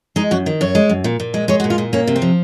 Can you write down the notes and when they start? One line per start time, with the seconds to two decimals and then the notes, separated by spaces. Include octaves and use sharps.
0.16 G#3 D#4
0.31 F#2 F#4
0.46 D#3
0.61 F#2 C#5
0.75 G#3
0.89 F#2
1.04 A#2
1.20 A#2
1.34 G#3
1.48 G#3 C#5
1.60 F#4
1.64 A#2
1.70 F4
1.78 A#2
1.93 A#3 C#4
2.07 C3
2.16 C4
2.22 F3